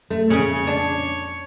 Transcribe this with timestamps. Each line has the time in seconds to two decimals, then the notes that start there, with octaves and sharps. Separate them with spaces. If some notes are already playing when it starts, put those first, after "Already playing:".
0.10 F#2 A3
0.30 F2 A#2 C#3 C#4 C#5
0.67 D4